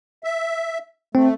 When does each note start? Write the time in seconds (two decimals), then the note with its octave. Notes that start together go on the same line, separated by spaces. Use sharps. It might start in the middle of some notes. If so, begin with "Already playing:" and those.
0.24 E5
1.15 A3 C4